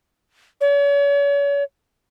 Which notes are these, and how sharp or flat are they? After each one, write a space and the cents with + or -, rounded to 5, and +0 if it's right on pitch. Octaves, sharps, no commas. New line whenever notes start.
C#5 +40